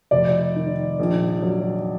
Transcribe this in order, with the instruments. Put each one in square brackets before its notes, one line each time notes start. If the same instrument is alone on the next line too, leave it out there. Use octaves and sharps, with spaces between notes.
[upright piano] F1 D5
D#3
A#1
F#3